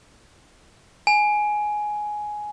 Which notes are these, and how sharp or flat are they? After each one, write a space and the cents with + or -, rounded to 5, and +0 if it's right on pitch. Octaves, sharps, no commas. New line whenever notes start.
G#5 +10